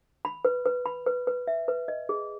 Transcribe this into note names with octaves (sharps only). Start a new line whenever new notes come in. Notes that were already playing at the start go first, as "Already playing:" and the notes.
B5
B4
B4
B5
B4
B4
E5
B4
D#5
G#4